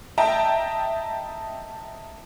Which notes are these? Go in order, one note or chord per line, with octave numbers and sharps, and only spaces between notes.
D#5 E5 G5 A5 A#5